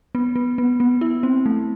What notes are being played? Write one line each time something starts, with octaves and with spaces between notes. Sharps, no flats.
B3
B3
B3
B3
E4
C4
A3